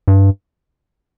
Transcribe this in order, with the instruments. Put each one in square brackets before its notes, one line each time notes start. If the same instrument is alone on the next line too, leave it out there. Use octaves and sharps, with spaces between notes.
[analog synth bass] G2